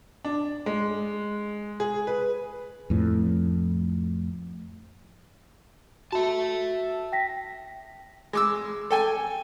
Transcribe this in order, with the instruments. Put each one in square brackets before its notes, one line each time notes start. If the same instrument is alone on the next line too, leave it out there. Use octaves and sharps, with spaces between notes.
[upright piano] D4
G#3
G#4
B4
[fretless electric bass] F2 A2
[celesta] F#4 [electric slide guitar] E5 A5
[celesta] G5 A#6 B6
[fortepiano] G#3 D6 E6
A4 G5 G#5